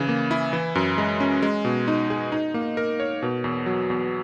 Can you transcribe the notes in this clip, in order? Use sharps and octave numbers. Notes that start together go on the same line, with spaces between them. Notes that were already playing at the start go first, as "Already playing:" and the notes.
Already playing: C#3 E3
A#3
E4
E3
F#2
G#3
C#4
G#3
B2
D#4
G#4
D#4
A#3
A#4
C#5
B2
E2
F#3
E2